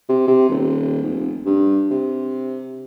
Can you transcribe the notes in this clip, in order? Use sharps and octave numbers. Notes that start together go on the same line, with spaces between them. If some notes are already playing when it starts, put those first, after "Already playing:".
C3
C3
D#1
F1
G2
C3